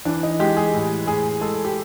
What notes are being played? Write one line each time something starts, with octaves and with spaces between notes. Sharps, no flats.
E3 D4
D#4
G#3 G4
G#4
A2
A2 G#4
G#3 A4
G4